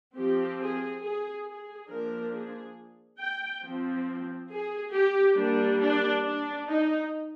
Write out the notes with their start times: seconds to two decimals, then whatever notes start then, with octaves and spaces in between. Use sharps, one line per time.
0.14 F3 C4 G4
0.59 G#4
1.02 G#4
1.46 G#4
1.88 F3 A#3 D4 A#4
2.32 G#4
3.19 G5
3.63 F3 C4
4.49 G#4
4.92 G4
5.36 G3 A#3 D4
5.79 D4
6.23 D4
6.66 D#4